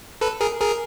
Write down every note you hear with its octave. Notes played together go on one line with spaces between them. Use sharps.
A4 B4
G#4 A#4
G#4 A#4